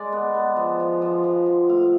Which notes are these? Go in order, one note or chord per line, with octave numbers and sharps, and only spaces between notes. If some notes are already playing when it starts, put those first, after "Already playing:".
Already playing: G#3 D5
B3
B3
F3
F3
F3
F3
F3
A2 F5